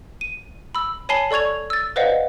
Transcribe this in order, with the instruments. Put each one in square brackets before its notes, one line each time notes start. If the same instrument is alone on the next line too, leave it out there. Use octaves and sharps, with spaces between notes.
[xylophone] D#7
B5 E6
C#5 G#5 A5 B5 C7 G7
A4 D5 C#6 G#6 F7
E6 A6
B4 C5 D5 D#5 F5 F#5